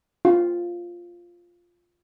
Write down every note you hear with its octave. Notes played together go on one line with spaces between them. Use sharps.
F4